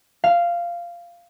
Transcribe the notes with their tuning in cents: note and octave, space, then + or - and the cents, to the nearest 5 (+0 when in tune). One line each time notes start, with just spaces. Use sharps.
F5 -10